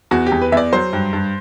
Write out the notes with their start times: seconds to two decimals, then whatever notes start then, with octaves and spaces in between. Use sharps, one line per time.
0.11 E2 F#4
0.27 G4
0.32 E2
0.42 B4
0.52 E2 E5
0.57 D5
0.72 F#3 C5
0.93 G2
1.13 G2